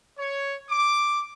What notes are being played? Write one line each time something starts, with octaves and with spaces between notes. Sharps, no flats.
C#5
D6